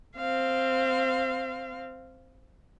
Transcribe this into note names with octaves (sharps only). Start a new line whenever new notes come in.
C4 F5